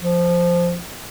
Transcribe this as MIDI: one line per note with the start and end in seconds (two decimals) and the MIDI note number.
0.02 0.80 53